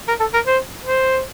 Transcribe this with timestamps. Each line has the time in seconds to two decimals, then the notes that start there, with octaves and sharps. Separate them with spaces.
0.08 A#4
0.20 A4
0.34 A#4
0.46 C5
0.85 C5